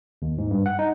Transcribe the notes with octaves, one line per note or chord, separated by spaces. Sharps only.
D#2
G#2
G2
F#5
D#4